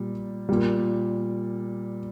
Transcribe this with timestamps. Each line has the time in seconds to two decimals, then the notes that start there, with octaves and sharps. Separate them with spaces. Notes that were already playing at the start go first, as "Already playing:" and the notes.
Already playing: A#2 G3
0.49 A#2 G3